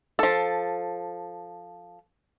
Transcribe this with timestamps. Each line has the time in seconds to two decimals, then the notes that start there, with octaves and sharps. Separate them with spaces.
0.19 F3 A4